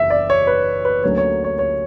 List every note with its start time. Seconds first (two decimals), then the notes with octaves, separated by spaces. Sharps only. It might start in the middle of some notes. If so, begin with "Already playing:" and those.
Already playing: F#1 E2 E5
0.10 D5
0.30 C#5
0.47 B4
0.85 B4
1.02 D2 D3 F#3 A#3 C#4 C#5
1.18 C#5
1.44 C#5
1.59 C#5